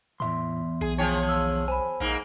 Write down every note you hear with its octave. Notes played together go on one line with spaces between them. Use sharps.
E2 A2 E5 C6
B1 G#4
F3 G#4 C#5 G5 A5
A5 E6
C5 G#5 B5
A#1 G#2 A#3